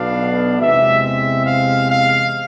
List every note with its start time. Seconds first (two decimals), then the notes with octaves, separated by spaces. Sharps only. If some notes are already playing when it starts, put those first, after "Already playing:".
Already playing: B1 B2 B3 D4 F5
0.60 E2 C3 G#3 C4 E5
1.03 E5
1.46 F5
1.89 F5